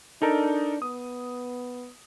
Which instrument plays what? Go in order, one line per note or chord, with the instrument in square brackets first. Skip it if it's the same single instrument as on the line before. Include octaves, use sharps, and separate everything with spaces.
[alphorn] D4 [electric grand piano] D#4 A4 A#4
[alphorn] B3 [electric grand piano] D#6